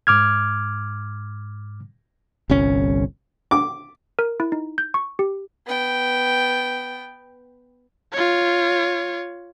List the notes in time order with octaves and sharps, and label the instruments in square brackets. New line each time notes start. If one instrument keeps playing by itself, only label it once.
[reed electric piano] G#2 D6 F6 G#6
[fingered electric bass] G1 C2 C#4
[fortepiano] D6
[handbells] A#4
E4
D#4
G6
C#6
G4
[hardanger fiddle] B3 G5
[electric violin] F4 C#5